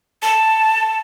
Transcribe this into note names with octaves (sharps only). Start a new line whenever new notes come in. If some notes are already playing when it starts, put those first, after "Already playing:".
A5